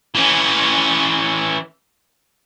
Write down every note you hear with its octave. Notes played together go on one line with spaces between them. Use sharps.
E3 C#4